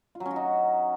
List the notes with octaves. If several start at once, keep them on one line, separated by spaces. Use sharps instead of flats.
F4
F#3
C#4
F#4
D#4